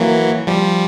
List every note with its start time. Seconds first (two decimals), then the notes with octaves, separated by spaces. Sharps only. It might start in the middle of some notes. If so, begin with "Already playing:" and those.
Already playing: E3 F#3 A#3
0.47 F3 G3